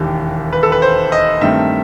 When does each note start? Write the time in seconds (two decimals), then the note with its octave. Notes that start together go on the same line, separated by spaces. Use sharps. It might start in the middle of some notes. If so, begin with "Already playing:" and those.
Already playing: E1 D#2 D#3 G4
0.53 B4
0.63 A4
0.72 B4
0.82 C5
1.12 D#5
1.41 G2 D#3 A3 C4 E5